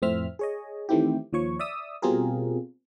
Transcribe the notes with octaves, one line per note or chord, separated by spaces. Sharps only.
F2 A2 C4 E5 F6
G#4 C#5 D#5
D#3 E3 A3 C4 E4 G4
D#2 F3 C#5 C#6
D5 E5 D#6 E6
B2 G3 C4 F4 G#4 A#4